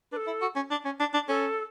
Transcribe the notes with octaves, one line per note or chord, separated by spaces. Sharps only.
D4 B4
A4
E4
F#4
C#4
D4
C#4
D4
D4
C#4 A4